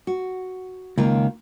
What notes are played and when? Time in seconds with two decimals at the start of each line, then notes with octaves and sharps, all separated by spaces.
0.07 F#4
0.98 C#2 D#3 A#3 F4